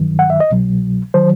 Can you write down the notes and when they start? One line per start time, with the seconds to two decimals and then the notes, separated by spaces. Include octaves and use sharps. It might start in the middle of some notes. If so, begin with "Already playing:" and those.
Already playing: G2 D#3 F#3
0.19 F#5
0.30 E5
0.40 D#5
0.50 C2 B2 F#3
1.14 D#3 F#3 C5